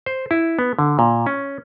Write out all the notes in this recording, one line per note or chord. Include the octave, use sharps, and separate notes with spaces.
C5
E4
B3
D3
A#2
C#4